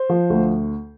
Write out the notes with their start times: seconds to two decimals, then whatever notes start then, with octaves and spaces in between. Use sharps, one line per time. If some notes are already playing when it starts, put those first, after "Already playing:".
Already playing: C5
0.09 F3
0.30 D2